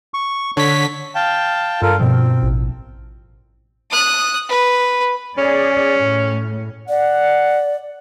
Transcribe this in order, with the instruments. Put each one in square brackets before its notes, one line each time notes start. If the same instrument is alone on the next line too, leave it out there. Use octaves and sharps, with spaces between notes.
[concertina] C#6
[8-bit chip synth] D3 B6 [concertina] C#5
[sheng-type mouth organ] F5 G5 A5
[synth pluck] G2 [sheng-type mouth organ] F4 A4 A#4
[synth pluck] G2 B2 F3 [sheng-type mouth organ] C4
[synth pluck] A1
[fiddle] D#6 F#6
B4
[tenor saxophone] C#4 [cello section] G#4 D5
[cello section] A2
[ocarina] D5 [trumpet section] F#5